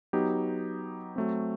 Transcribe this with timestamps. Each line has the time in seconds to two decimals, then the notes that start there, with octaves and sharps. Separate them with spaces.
0.13 F#3 B3 D#4 G4
1.16 F#3 A3 C4